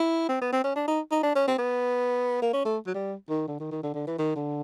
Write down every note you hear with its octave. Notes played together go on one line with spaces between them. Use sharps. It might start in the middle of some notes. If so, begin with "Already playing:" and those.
Already playing: E4
C4
B3
C4
C#4
D4
D#4
D#4
D4
C#4
C4
B3
A#3
C#4
A3
F#3
G3
D#3
D3
D#3
D#3
D3
D3
E3
D#3
D3